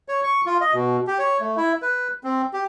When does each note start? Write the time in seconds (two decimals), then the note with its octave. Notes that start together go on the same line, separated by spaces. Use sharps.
0.08 C#5
0.23 C#6
0.46 F4
0.61 D#5
0.74 B2
1.07 G4
1.19 C#5
1.40 A3
1.57 E4
1.82 B4
2.24 C4
2.53 G4